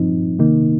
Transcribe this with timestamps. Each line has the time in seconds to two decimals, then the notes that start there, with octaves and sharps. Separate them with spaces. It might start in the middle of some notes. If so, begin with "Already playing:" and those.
Already playing: G2 F3 C4 D#4
0.39 C3 D#3 A#3 D#4